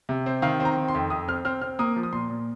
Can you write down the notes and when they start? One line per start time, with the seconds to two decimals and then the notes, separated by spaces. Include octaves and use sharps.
0.09 C3
0.26 C4
0.42 D#3 F5
0.60 C4
0.65 A#5
0.77 D#3
0.88 C6
0.95 F2
1.10 F2 D#6
1.28 C4 F6
1.45 C4 F6
1.61 C4 F6
1.79 A#3 D#6
1.96 F3
2.03 D#6
2.13 A#2 C6
2.30 A#2